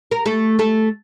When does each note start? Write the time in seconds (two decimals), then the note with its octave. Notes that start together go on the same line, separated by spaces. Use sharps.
0.11 A#4
0.26 A3 A4
0.59 A3 A4